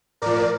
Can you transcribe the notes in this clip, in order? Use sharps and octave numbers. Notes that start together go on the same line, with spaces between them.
A2 F3 A#4 D5